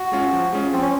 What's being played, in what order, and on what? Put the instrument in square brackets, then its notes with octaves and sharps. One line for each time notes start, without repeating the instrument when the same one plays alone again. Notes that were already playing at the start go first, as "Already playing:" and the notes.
Already playing: [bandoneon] F#4
[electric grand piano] G#3 C#4 F4
F3
G#3 C#4 F4
[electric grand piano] F3 [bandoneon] C4
[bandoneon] C#4